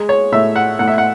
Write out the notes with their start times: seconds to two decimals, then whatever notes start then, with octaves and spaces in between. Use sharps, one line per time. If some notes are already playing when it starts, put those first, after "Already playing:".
Already playing: G#3
0.09 C#5
0.32 A2 E5
0.56 F#5
0.79 A2 F#5
0.88 E5
0.98 F#5